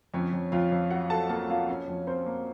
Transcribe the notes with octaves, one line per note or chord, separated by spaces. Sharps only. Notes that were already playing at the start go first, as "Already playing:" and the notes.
F2 C#4 C#5
F2
F2 F4 F5
F2
F#3 F#4 F#5
F#3 A4 A5
A#3 A4 A5
A#3 F4 F5
C#4 C#5
F2
C4 C#4 C5
A#3